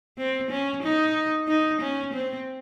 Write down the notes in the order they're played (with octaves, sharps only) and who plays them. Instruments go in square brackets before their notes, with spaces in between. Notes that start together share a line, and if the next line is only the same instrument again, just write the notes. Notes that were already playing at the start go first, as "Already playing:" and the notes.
[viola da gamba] C4
C#4
D#4
D#4
C#4
C4